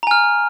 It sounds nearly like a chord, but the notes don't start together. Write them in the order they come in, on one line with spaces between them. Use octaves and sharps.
A#5 G#5 F6